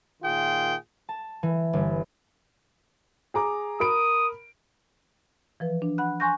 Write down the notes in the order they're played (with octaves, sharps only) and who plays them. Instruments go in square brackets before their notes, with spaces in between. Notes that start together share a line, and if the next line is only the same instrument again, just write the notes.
[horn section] A#2 D#3 F4 G#4 G5
[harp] A5
E3
G1
[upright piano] G#4 A#5 D6
[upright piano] A#4 B5 D7 [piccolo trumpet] D#6
[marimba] E3 F3 B4
D4
F#5 B5 F#6
G#5 C6 C#6 F#6 G6 A#6